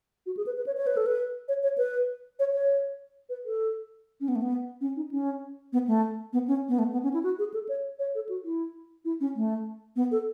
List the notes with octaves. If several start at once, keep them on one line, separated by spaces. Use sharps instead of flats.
F#4
G#4
B4
B4
C#5
C#5
B4
A4
B4
C#5
C#5
B4
C#5
C#5
B4
A4
C#4
B3
A3
B3
C#4
D#4
C#4
B3
A3
B3
C#4
B3
A3
B3
C#4
E4
F#4
G#4
A4
C#5
C#5
A4
F#4
E4
E4
C#4
A3
B3
A4